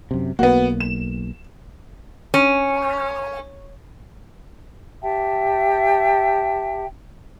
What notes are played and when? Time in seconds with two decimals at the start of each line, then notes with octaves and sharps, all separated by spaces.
0.11 F#2 C3
0.39 B1 A#3 B3 F#4
0.80 E7
2.34 C#4
5.02 G4 E5 G5 A5